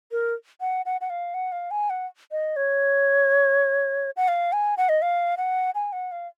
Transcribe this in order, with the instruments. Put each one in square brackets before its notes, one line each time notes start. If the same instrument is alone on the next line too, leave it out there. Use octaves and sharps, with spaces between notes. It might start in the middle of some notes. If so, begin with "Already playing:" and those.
[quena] A#4
F#5
F#5
F#5
F5
F#5
F5
G#5
F#5
D#5
C#5
F#5
F5
G#5
F#5
D#5
F5
F#5
G#5
F#5
F5